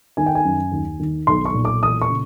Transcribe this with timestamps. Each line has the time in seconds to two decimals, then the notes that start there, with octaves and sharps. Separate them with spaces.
0.17 D#3 G#5
0.26 G5
0.35 G#5
0.45 F#2
0.72 D#2
1.00 D#3
1.27 B1 C6
1.45 C#6
1.54 A#2
1.65 D6
1.83 E3 D#6
2.02 C#6
2.10 C#3